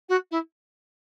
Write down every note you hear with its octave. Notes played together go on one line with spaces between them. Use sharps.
F#4
E4